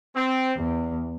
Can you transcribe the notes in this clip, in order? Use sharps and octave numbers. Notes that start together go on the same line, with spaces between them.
C4
E2